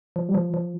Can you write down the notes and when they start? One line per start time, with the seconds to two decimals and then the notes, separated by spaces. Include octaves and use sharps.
0.16 F3
0.29 G3
0.34 F3
0.54 F3